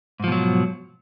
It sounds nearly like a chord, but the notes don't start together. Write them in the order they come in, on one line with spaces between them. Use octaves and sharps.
G#2 F3 B2 F#3